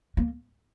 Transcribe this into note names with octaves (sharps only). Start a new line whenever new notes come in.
A#3